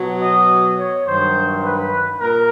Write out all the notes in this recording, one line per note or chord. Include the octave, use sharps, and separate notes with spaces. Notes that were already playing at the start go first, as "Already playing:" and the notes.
Already playing: B2 F#3
D#5
C#5
G2 D#3 F#3 C5
B4
A#2 A#4